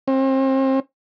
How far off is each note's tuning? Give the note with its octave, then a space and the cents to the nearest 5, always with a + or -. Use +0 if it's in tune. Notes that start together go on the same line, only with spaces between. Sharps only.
C4 +35